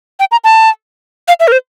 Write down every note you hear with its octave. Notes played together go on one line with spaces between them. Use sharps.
G5
A#5
A5
F5
E5
A#4
C5